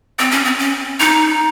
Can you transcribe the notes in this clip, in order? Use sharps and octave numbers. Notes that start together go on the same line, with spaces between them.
C4
C#4
C4
C#4
D#4